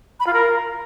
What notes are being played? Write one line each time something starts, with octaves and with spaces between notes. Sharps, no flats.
B5
F4
A#4